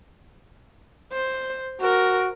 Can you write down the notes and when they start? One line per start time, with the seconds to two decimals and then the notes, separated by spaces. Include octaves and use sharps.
1.12 C5
1.81 F#4 A#4